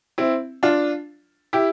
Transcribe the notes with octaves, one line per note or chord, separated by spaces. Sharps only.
C4 E4
D4 F4
E4 G4